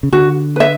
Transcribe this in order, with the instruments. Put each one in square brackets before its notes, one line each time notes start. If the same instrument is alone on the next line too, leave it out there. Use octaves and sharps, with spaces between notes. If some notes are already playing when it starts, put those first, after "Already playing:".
[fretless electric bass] C#3
[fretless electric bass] D3 [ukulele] F#4
[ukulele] B4 E5